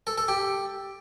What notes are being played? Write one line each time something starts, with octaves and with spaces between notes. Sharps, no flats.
A4
A4
G4